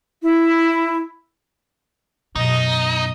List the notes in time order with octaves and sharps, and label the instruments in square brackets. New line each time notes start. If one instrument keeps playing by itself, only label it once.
[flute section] E4
[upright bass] F#2 B2 [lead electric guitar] D#4 [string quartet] D#5 A#5